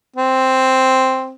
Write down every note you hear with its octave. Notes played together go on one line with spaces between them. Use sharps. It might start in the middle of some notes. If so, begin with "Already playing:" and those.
C4